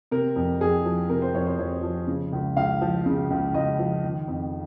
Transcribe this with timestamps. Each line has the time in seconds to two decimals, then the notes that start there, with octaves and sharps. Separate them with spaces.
0.11 C3 A#4
0.36 F2
0.61 F2 G#4
0.86 F3
1.10 C3 A#4
1.22 C5
1.34 F2 C#5
1.46 C5
1.58 F2 C#5
1.83 F3
2.07 C#3
2.33 C#2
2.57 C#2 F5
2.82 F3
3.06 C#3
3.31 C#2
3.54 C#2 D#5
3.79 F3
4.04 D#3
4.28 F2